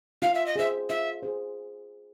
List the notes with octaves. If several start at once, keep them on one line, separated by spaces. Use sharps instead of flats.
F4 F5
E5
D#5
G#4 C5 E5
F4 E5
G#4 C5